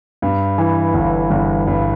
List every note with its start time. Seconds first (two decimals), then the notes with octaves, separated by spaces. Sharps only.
0.22 G2
0.58 E3
0.94 G1
1.31 G1
1.67 G2